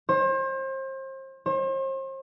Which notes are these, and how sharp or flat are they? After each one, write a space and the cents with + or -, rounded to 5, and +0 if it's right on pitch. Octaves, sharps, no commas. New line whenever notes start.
C5 +35
C5 +40